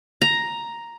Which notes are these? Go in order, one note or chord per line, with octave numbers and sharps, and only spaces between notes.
A#5